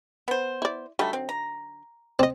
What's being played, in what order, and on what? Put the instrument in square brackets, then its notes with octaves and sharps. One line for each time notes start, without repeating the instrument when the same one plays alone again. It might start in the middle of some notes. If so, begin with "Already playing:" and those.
[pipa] B3 C5
[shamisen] E4 D5
[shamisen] D3 F#3 D#4 [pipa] G3 A3
[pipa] C4
A#5
[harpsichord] C4 [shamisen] D5 D#5